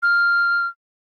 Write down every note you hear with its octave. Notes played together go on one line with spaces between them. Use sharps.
F6